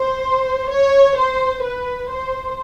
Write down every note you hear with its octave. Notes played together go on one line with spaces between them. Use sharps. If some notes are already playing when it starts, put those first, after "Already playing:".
Already playing: C5
C#5
C5
B4
C5